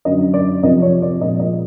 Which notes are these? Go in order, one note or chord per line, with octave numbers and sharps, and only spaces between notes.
F#2 D3 F#3 D#5
D5
F2 C3 F3 D#5
C#5
D5
A#2 F3 G#3 D#5
D#5